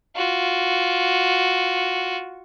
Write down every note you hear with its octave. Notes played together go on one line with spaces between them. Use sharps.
F4 F#4